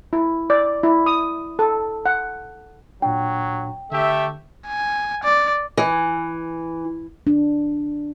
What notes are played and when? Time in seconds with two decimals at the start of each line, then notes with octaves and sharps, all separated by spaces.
0.13 E4
0.50 D5
0.83 E4
1.06 D#6
1.59 A4
2.06 F#5
3.02 A#2 F#3 D4 G5
3.92 D3 A3 G4 E5
4.67 G#5
5.23 D5
5.77 E3
7.27 D4